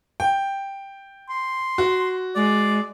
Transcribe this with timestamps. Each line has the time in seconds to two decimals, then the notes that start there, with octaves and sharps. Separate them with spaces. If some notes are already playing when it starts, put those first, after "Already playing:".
0.20 G5
1.30 C6
1.78 F#4
2.36 G#3 D5